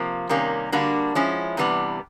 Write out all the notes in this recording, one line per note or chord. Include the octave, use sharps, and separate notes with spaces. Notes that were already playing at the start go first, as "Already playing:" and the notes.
Already playing: C3 F3 A#3
C3 D#3 G3 A#3 C#4
D3 G3 A#3 D4 F#4
F3 G#3 C#4 E4
C3 E3 G3 B3 D4